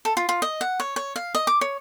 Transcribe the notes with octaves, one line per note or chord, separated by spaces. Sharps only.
A4
F4
F4
D#5
F#5
C#5
C#5
F5
D#5
D6
C#5